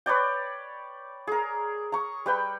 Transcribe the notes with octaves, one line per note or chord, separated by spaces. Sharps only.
B4 C#5 D5 G5
G#4 A#4
A#5 C#6
G3 B4 G5